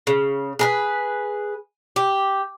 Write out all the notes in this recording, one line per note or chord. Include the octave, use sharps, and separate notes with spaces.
C#3
G#4 A#4 B4
G4